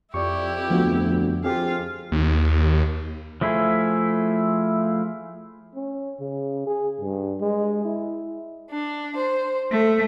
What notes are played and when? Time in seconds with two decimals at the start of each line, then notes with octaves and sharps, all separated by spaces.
0.14 F2 E4 G4 D5 C#6
0.70 D2 F3 B3 F#4
1.44 F2 F4 G4 G#4 F5
2.12 D#2
3.41 F3 A3 E4 G#4
5.75 C#4
6.20 C#3
6.66 G#4
7.01 G2
7.41 G#3
7.85 E4
8.69 D4
9.15 C5
9.72 A3